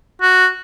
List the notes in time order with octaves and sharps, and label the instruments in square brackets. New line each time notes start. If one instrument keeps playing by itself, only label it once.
[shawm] F#4